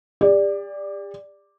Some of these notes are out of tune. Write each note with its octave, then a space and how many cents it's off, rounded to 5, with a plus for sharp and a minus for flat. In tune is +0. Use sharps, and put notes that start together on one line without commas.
G4 +40 D5 +0